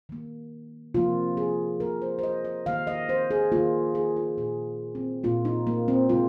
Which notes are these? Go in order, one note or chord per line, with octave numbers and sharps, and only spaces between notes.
D#3 A#3
C3 F3 A#3 F4
G#4
C3 F3 A#3 A#4
C5
C5
D#5
D#5
D#3 A#3 F5
D#5
C5
G#4
D#3 A#3 F4
G#4
F4
A#2 A#3 G#4
C4
A#2 A#3 F4
D#4
A#3
C4
C3 G#3 F4